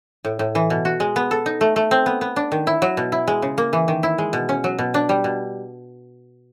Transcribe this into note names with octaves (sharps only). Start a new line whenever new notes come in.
A2
A2
E3
B2
F#4
G#3
B3
A4
D#4
A3
A3
C4
B3
B3
D4
D#3
E4
F#3
B2
E4
G#3
C#3
A#3
E3
D#3
E4
G#3
B2
C#4
F#3
B2
D4
G3
B2